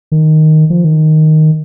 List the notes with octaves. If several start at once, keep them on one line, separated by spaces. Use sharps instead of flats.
D#3
F3
D#3